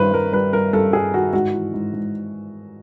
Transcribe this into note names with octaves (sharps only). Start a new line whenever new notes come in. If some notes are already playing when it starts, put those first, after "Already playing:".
Already playing: G2 D#3 B4 C5
G2 A#4
G3 B4
G2 A#4
G2 A4
G2 G#4
D#3 F#4
G#2 F#4
E3
G#2
G#2